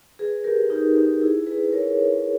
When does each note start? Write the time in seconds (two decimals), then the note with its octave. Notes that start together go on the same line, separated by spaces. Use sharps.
0.19 G#4 B4
0.44 G4 A#4
0.70 D#4 G4
0.95 D#4 G4
1.21 E4 G#4
1.47 G#4 B4
1.72 A#4 C#5